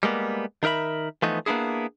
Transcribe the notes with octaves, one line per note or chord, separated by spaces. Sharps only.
G3 G#3 A#3 B3
D#3 D#4 A#4 E5 B5
E3 F3 A3 B3 D#4
A#3 B3 D4 E4 G#4